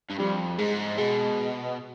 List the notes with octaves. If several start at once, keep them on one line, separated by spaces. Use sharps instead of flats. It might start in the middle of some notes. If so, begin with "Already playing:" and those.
G2
F2 G3
G#2 G#3
B2 G#3